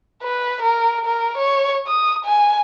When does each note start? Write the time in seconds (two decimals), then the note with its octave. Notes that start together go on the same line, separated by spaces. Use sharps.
0.23 B4
0.62 A#4
1.05 A#4
1.38 C#5
1.88 D#6
2.25 G#5